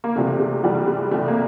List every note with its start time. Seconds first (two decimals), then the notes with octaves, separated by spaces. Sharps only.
0.04 A#3
0.16 C2 C3 E3 A3
0.40 G#3
0.63 C2 C3 E3 G3
0.88 G#3
1.11 C2 C3 E3 A3
1.28 A#3